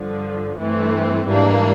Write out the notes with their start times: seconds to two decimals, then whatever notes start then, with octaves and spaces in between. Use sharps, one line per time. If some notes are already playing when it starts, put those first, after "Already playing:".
Already playing: G2 D3 F3
0.59 G2 E3 A3 C4
1.27 G#2 E3 G3 A#3 D4